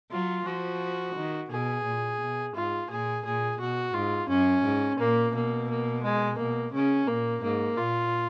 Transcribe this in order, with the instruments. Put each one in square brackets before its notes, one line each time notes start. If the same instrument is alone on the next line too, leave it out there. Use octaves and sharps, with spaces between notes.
[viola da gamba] F#3 [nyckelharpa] F4
[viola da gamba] F3 [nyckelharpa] F#4
[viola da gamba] D#3
[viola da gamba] B2 [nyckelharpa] G#4
[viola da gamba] A#2
B2
[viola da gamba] G#2 [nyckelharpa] F4
[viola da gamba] A#2 [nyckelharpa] G#4
[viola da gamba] A#2 [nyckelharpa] G#4
[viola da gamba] B2 [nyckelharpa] F#4
[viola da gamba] G#2 [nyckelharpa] F4
[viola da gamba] F#2 [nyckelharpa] C#4
[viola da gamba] G#2
[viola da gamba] A#2 [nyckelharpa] A#3
[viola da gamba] B2 [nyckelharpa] A#3
[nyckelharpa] A#3
G#3
[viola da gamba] B2 [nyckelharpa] A#3
[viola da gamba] C#3 [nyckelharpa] C#4
[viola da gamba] A#2 [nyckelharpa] A#3
[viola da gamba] G#2 [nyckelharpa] A#3
[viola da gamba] A#2 [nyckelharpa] F4